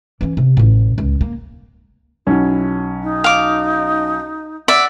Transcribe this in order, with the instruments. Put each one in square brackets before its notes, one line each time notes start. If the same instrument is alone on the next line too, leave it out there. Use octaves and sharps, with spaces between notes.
[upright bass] E3 C#4
C3
A1 A2
C#2
A#3
[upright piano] B1 C#4 [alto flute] E4
[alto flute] D#4
[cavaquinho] F5 D6
[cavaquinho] D5 E5 [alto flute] F#5